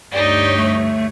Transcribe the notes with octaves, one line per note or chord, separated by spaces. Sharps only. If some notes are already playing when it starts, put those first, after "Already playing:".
D2 G2 D#4 G4 C#5 D5
A3